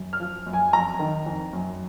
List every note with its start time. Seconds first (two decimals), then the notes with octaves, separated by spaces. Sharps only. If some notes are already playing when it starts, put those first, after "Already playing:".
Already playing: F#2
0.13 F6
0.20 F3
0.46 F#2
0.53 G#5
0.73 F2 A#5
0.99 D#3
1.26 F2
1.53 F#2